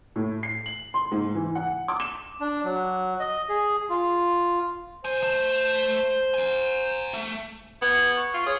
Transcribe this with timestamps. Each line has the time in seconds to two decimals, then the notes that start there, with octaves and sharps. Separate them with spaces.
0.16 A2
0.43 C7
0.66 F#7
0.94 C6
1.11 G#2
1.35 E3
1.55 F#5
1.88 D6
2.00 E7
2.41 D4
2.65 F#3
3.20 D#5
3.49 G#4
3.90 F4
5.05 B1 C5 G#5
5.23 A3 A5
6.34 F#5 G#5
7.13 A3
7.82 B3 G#6
8.16 C#6
8.34 F4
8.46 G#4 C#5